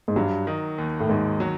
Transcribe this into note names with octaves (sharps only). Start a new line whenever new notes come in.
G#2
G2 F#3
D#3
D#2
A2
D#2 G#2
F#3